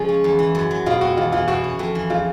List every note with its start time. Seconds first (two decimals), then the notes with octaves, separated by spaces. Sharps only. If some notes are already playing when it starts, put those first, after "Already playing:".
Already playing: C#3 F3 G#3
0.09 C#4
0.24 E2
0.39 E3
0.55 F#2
0.71 F#3
0.86 B2 F4
1.01 C4 F#4
1.17 E2 F4
1.32 E3 F4
1.48 B2 F#4
1.64 C#4
1.79 F2
1.95 E3
2.10 C#3 F4